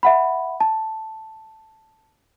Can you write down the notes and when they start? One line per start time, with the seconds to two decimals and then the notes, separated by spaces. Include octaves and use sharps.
0.03 E5 F#5 B5
0.60 A5